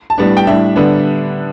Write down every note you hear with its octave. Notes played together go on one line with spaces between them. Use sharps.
A5
A2 G3 B3 D4
G5
A2 G3 D4 E5
D3 G3 B3 D4